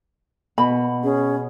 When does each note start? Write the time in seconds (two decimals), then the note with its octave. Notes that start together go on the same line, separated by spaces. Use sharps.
0.58 B2 B5
1.03 C#4 G#4